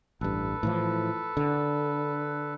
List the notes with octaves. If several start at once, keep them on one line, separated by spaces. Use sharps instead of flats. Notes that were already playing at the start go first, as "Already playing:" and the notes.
A1 G2 A4 B4
A2 E3 F3
D3